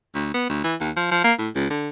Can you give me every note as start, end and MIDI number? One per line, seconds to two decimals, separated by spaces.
0.15 0.33 38
0.34 0.46 59
0.49 0.64 38
0.64 0.75 52
0.80 0.90 39
0.97 1.11 53
1.11 1.20 53
1.24 1.33 58
1.39 1.49 45
1.55 1.67 37
1.71 1.90 50